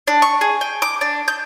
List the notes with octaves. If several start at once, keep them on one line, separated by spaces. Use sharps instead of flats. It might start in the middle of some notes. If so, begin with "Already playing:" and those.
D4
C#6
G#4
G5
D6
D4
G6